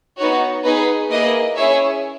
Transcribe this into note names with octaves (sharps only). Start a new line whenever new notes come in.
B3 D#4 F#4 C#5
B3 D#4 G#4 B4
A#3 E4 G#4 B4 D#5
C#4 E4 G#4 C#5 E5